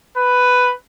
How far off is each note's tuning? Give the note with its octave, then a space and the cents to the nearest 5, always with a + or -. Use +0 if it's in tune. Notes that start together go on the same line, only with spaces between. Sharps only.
B4 +5